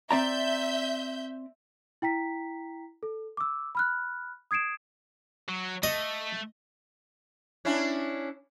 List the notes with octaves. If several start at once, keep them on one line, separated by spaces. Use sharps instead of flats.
C4 D5 E5 A#5 G6
E4 G5 A#5 B6
A4
D6 E6
B5 F6 F#6
D#6 G#6 C7 D7 E7
F#3
A3 D#5
C#4 D4 E4